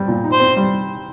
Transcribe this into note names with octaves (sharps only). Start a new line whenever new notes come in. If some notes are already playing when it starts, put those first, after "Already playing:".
Already playing: G3 C4
A#2
D#4
C5
C4
G3